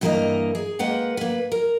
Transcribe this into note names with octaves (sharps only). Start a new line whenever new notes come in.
G2 E3 A#3 F#4 A#4 D#5
G#4
G#3 A#3 B4 F#5 G5
A#3 B4
A#4